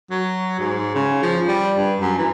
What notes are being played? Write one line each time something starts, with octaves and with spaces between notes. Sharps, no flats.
F#3
G#2
C#3
F3
G3
G2
F#2
E3